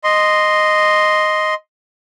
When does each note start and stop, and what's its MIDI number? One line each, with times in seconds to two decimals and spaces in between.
0.04 1.54 75
0.04 1.54 84